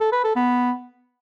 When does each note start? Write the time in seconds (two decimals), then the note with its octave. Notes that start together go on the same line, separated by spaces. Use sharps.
0.01 A4
0.12 B4
0.24 A4
0.36 B3